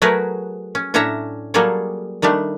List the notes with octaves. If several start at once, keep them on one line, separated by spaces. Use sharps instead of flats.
F#3 A3 F#4 G#4 A#4 B4
C#4
A2 C#4 D4 C#5 E5 A#5
F#3 G3 A#3 G#4 A4 C#5
D#3 G3 A3 D4